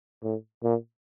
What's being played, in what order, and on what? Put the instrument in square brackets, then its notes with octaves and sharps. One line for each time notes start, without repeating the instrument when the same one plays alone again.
[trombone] A2
A#2